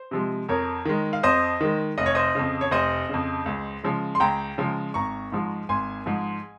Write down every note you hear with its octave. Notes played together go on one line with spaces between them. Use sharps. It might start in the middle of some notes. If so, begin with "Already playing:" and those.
Already playing: C5
C3 F3 G#3
F2 A#4 C#5
D#3 G#3
F5
F2 C5 D#5
D#3 G#3
F1 D#5
C#5
C5 D#5
F2 C#3
C#5
F1 C5 D#5
F2 C#3
C#2
C#3 F3 G#3
C6
C#2 G5 A#5
C#3 F3 G#3
G#1 A#5 C#6
G#2 F3 G#3
G#1 G#5 C6
G#2 F3 G#3